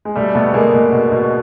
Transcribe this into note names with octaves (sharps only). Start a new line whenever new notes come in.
G#3
B2 G3 A3
B2 A3 B3
B2 G#3 A#3
B2
B2
B2